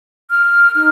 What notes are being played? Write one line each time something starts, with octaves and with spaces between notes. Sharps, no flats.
F6
D#4 F6